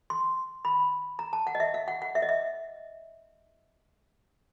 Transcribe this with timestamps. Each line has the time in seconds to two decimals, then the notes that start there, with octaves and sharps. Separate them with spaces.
0.10 C6
0.65 B5
1.19 A#5
1.33 A5
1.47 F#5
1.55 D#5
1.60 E5
1.74 F5
1.88 F#5
2.02 F#5
2.15 E5
2.22 D#5
2.29 E5